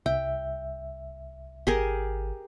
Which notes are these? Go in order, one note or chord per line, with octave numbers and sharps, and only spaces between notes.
C2 E5 G5
G#1 G4 G#4 A#4